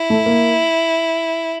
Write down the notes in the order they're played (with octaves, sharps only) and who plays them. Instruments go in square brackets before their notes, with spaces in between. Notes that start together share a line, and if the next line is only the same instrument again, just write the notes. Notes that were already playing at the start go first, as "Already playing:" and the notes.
Already playing: [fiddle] E4
[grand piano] A3
A#3